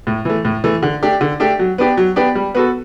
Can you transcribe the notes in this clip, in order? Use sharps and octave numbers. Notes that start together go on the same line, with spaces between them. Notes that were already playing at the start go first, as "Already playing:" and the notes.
A2
E3 A3
A2
E3 A3
D3
A3 D4 G4
D3
A3 D4 G4
F#3
B3 D4 G4
F#3
B3 D4 G4
G3
B3 F#4 A4